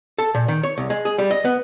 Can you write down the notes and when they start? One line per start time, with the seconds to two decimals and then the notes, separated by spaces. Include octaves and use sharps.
0.18 A4
0.35 A#2
0.48 D#3
0.63 C#5
0.78 C2
0.90 G#3
1.05 G#4
1.18 G3
1.31 D#5
1.45 B3